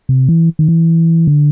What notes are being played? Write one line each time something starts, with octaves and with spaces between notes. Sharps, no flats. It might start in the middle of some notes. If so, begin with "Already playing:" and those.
C3
E3
D#3
E3
D3